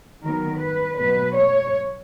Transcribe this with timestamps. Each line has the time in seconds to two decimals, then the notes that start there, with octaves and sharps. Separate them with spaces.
0.23 D#3 F#3 B3 A#4
0.60 B4
0.99 B2 F#3 B3 B4
1.36 C#5